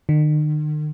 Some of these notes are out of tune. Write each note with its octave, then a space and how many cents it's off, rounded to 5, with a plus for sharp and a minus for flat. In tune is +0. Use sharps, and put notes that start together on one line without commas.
D#3 -45